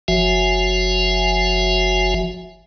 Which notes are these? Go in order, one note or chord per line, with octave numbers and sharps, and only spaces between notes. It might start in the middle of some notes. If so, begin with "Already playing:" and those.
F#1 F3 F#4 E5 G#5